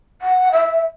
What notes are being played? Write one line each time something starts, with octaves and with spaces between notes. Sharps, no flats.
F#5
E5